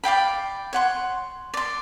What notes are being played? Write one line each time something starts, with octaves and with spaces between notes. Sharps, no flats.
D5 F5 G5 B5
C#5 F#5 C6
D5 C6